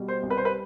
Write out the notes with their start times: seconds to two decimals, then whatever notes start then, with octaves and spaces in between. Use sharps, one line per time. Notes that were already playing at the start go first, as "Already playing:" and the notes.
Already playing: B2 G3
0.08 C5
0.23 C2
0.30 B4
0.37 C5
0.45 B4